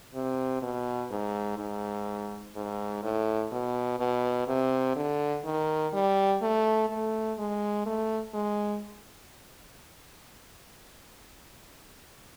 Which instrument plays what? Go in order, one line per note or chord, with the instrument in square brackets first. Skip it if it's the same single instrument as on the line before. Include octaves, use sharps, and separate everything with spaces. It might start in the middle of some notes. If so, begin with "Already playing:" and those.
[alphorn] C3
B2
G#2
G#2
G#2
A2
B2
B2
C3
D3
D#3
G3
A3
A3
G#3
A3
G#3